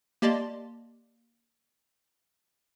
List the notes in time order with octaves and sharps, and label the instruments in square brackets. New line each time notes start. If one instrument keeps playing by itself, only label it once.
[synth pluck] A#3 G4 D5 D#5 A5 C6